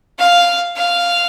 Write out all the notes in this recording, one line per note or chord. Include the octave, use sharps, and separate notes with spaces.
F5
F5